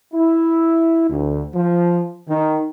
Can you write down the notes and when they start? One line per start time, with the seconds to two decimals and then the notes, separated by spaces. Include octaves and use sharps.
0.14 E4
1.10 D2
1.55 F3
2.29 D#3